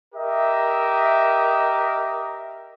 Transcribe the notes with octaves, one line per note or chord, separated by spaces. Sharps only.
G4 A#4 D#5 E5